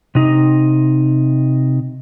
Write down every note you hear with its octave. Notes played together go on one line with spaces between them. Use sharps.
C3 D#4